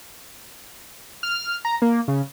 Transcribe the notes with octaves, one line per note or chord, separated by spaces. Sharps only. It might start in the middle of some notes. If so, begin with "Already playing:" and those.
F6
A#5
A#3
C#3